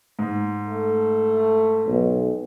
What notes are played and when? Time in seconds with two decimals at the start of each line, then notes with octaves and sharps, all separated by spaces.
0.19 G#2
0.68 A3
1.87 B1